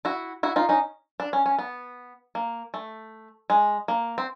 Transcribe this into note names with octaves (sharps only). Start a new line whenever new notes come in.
E4 F#4
E4 F#4
D#4 F4
C#4 D#4
D4
C#4
C#4
B3
A#3
A3
G#3
A#3
C4